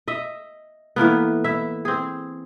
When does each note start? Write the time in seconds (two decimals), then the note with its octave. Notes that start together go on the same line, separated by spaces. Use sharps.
0.08 D#5 E5
0.96 A2 E3 A#3 B3
1.44 E4 E5
1.85 C4 G#4